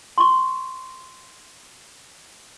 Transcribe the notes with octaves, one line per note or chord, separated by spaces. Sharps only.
C6 C#6